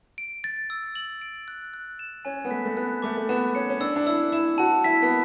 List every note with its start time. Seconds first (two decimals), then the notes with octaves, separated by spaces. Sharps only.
0.18 D7
0.44 A6
0.70 E6
0.95 F#7
1.21 D7
1.48 F#6
1.74 F#6
1.99 E7
2.25 C#4 G#5
2.45 B3
2.51 A3 B6
2.65 A3
2.77 B3 F#6
3.02 A3 D6
3.17 A3
3.29 B3 E7
3.55 C#4 C#7
3.69 C#4
3.80 D4 E6
3.96 D4
4.06 E4 E6
4.32 E4 E7
4.58 F#4 A5
4.84 E4 B6
5.02 B3